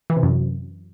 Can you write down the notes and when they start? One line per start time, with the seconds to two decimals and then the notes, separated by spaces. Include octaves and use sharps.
0.10 E3
0.16 C3
0.23 F#2